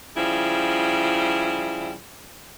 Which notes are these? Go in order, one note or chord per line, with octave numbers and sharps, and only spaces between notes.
C#3 F3 G3 E4